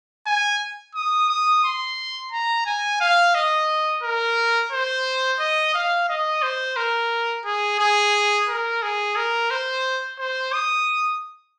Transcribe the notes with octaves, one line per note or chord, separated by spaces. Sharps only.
G#5
D#6
D#6
C6
A#5
G#5
F5
D#5
A#4
C5
D#5
F5
D#5
C5
A#4
G#4
G#4
A#4
G#4
A#4
C5
C5
D#6